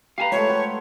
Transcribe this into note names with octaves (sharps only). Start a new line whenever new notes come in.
G4 B4 F5 G#5 A#5
F3 G#3 A3 C#5
C5 F#5